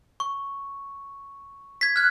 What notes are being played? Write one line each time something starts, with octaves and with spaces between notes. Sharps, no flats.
C#6
G#6 B6
F6 F#6 G#6